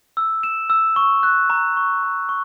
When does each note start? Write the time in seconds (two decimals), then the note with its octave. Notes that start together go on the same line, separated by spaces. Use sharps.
0.17 E6
0.43 E7
0.70 E6
0.96 C#6
1.23 F#6
1.50 A#5
1.77 C#6
2.03 A#5
2.29 C#6